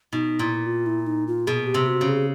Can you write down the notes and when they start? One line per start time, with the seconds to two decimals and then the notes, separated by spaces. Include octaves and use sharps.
0.12 B2 D#4
0.39 A#2 E4
0.66 F4
0.86 E4
1.07 D#4
1.28 F4
1.47 B2 G#4
1.67 G4
1.74 C3
1.87 F#4
2.01 C#3
2.08 G#4